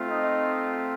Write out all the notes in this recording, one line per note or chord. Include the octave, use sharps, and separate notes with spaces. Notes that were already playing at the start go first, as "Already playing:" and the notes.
Already playing: A3 C4 F4
D#4 D#5